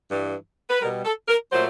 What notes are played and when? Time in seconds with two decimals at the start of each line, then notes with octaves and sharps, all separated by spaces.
0.09 G2 E3 G3
0.69 B4
0.80 B2 G3 A#4
1.04 A4
1.28 A#4
1.52 A#2 F#3 A3 C5